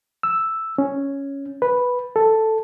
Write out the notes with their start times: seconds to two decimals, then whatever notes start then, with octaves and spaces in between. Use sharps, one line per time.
0.23 E6
0.78 C#4
1.62 B4
2.16 A4